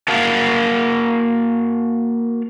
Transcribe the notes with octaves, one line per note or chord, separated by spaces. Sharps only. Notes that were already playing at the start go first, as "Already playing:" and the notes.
A#3 F#4 A#4 F5 F#5 A5